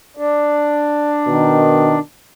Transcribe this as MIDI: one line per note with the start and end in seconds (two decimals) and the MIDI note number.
0.17 1.99 62
1.27 1.98 47
1.27 1.98 51